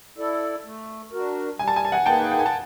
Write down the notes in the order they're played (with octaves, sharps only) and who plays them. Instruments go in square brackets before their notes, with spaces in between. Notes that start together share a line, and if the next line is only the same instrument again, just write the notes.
[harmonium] E4 A4 D5
A3
D4 F#4 A#4
[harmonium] G3 [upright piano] G#5
[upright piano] A5
G#5
A5
F#5 G#5
[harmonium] A#3 D#4 G#4 B4 [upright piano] G5 A5
[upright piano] G5
G#5
A5